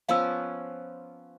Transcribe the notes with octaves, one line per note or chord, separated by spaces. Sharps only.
F3 B3 C#4 F5 E6